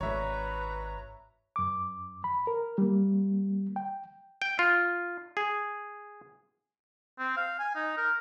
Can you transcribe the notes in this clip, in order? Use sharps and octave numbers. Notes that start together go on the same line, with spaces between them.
G#1 D4 F#4 B4 C#5 E5 A#5
F#2 D6
B5
A#4
G3 A#3
G5
G5
F4
G#4
C4
F5
G#5
D#4
A#4